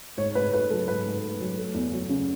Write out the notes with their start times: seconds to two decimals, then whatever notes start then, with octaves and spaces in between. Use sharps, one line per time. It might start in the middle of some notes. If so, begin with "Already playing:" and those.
0.18 G#2 C#5
0.35 G#2 B4
0.53 A3 B4
0.70 F#3 A4
0.88 G#2 B4
1.05 G#2
1.23 A3
1.40 F#3
1.58 A3
1.74 E2
1.92 F#3
2.09 C#3